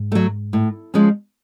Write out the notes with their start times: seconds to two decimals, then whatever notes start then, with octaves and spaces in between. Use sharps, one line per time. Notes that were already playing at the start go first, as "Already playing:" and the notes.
Already playing: G#2
0.12 F#3 A3
0.53 A2
0.94 F3 G#3 C#4